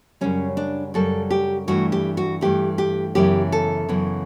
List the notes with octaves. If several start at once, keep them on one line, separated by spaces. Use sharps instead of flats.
F#2 C#3 G3 C#4
D4
F#2 C#3 G3 A4
G4
G2 E3 A3 F#4
G4
F#4
G2 E3 A3 G4
G4
F#2 C#3 E3 B3 G4
A4
F#2 C#3 E3 B3